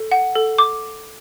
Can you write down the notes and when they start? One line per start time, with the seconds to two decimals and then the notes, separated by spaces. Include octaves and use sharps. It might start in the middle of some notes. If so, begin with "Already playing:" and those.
Already playing: A4
0.11 F#5
0.35 A4
0.58 D6